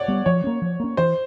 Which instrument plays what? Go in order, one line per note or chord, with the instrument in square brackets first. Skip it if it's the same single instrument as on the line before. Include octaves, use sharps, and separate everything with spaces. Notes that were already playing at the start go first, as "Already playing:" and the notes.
Already playing: [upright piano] C#5 D5 F#5
[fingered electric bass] G3 B3
[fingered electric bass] F3 [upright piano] C#5
[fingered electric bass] A#3 C#4
F3
A#3 C#4
[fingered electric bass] E3 [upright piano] C5